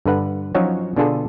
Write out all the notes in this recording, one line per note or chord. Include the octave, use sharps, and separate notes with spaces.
G2 D3 B4 F#5
F3 F#3 C#4 D#4 F#4 C#5
B2 D3 D4 F4 G#4 A4